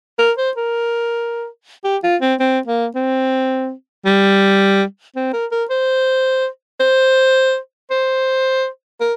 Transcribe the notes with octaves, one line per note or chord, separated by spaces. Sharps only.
A#4
C5
A#4
G4
F4
C4
C4
A#3
C4
G3
C4
A#4
A#4
C5
C5
C5
A#4